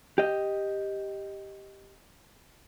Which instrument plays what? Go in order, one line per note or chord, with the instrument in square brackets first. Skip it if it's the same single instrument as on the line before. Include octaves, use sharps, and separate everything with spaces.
[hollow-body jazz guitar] G4 D#5